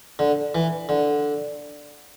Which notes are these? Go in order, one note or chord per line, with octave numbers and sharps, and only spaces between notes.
D3
E3
D3